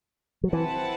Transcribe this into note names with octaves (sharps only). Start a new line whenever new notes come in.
F#3
E3 C4 E4 B4 F#5 A5